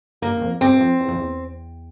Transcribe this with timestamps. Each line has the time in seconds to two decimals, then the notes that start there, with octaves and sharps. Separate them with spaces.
0.22 G2 A#3
0.37 G2
0.42 F2
0.61 G2 C4
0.74 G2
0.81 F2
1.00 E2
1.08 F2
1.16 E2